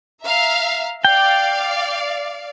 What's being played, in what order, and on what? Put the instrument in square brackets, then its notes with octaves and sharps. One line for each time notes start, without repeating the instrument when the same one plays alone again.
[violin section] E5 F5 A#5
[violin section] D5 F5 [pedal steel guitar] G5